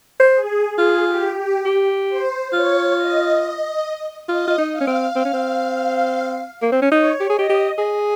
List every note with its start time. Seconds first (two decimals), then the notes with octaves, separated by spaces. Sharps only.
0.20 C5
0.34 G#4
0.78 F4 G#4
1.07 G4
1.37 G4
1.65 G4
2.09 C5
2.53 F4 C#5
2.97 D#5
4.29 F4 D#5
4.48 F4
4.58 D#4
4.72 F5
4.81 C#4
4.87 C4
5.16 C4
5.25 C#4
5.33 C4
6.62 A#3
6.72 C4
6.82 C#4
6.91 D#4 C#5
7.20 G4
7.29 G#4
7.35 G4 D#5
7.49 G4
7.78 G#4